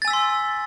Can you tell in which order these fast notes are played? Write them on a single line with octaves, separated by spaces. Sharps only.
A6 G#5 E6 B6 C6